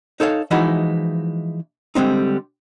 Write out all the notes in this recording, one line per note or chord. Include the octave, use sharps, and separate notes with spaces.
D#4 A4 C#5 F5
E3 F3 G#3 D#4 E4 F#4
D3 G3 G#3 C4 D#4